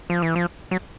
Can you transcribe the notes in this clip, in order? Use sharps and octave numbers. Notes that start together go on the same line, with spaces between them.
F3
E3
F3
F#3